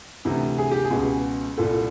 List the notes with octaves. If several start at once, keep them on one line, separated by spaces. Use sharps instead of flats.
D2 C3 E3
G#4
G4
G#4
C#2 B2
C2 A#2 A4